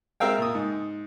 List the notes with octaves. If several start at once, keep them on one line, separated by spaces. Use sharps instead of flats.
G#3 C4 A#4 E5 F5 G5
A#2 D#6
G#2